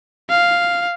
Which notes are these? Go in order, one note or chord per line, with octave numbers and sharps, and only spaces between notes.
F5